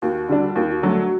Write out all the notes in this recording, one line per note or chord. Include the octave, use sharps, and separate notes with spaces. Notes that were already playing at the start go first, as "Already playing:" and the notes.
D#2 F#4
D3 G3 D4
D#2 F#4
D#4
F#4
D3 F#3 A3